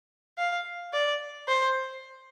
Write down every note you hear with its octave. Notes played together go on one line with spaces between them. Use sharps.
F5
D5
C5